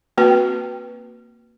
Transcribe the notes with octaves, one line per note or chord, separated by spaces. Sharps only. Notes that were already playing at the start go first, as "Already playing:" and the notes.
A#3 C4 F#4 B4 G5